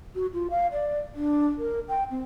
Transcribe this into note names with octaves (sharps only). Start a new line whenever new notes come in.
F#4
F4
F5
D5
D4
A#4
G5
C4